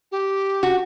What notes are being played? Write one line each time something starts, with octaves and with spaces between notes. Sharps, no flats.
G4
F#4